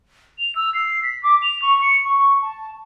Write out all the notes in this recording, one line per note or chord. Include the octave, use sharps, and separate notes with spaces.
F7
E6
C7
B6
D6
F7
C#6
C#7
C#6
A5